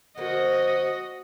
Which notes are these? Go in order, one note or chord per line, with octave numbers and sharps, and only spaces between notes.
D3 F3 A#3 F#4 D#5